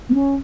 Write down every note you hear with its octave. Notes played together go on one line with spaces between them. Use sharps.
B3
C#4